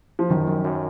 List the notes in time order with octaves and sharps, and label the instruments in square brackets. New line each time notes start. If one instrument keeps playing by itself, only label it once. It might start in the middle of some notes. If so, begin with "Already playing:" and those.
[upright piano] F3
[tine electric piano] F#2 [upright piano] D#3
[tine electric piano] F#2
F#2